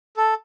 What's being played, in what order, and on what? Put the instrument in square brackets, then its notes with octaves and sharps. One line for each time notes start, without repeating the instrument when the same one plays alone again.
[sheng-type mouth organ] A4